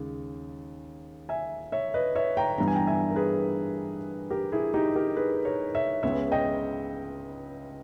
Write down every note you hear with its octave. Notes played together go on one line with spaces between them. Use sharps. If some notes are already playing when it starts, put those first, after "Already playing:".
Already playing: D#2 C#3 G#3
E5 G#5
C#5 E5
B4 D#5
C#5 E5
G5 A#5
G2 E3 G3 B3 A#5
G#5
G5 A#5
E5 G#5
A#4
G#4 B4
G4 A#4
E4 G#4
D#4 G4
G4 A#4
G#4 B4
A#4 C#5
C#5 E5
C#2 C#3 G#3 B3 C#5 E5
D#5 G5